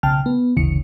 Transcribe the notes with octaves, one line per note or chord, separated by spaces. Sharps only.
B1 C#3 G5 A5 F6
B3
G1 D2 C#3 E3 C#7